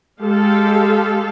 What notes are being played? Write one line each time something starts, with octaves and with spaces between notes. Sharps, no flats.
G#3 G4 A4 F5